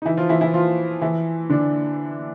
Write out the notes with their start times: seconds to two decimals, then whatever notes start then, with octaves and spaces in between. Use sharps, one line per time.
0.02 D#4
0.05 E3 E4
0.17 F3 F4
0.29 E3 E4
0.41 E3 E4
0.54 F3 F4
1.02 E3 E4
1.49 D3 D4